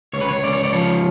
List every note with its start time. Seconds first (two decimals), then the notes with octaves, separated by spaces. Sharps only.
0.13 C#2 C#5
0.21 B4
0.29 C#5
0.44 C#2 D5
0.53 C#5
0.64 D5
0.73 F3 C#5